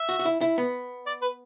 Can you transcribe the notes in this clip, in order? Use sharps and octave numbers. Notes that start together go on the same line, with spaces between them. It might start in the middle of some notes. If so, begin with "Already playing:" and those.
Already playing: E5
F#4
F#4
E4
E4
B3
D5
B4